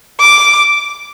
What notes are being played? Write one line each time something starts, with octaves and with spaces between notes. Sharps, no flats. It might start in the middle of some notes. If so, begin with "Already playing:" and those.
D6